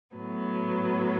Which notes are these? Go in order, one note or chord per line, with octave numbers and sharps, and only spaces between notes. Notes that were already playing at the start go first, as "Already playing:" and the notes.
A2 F#3 B3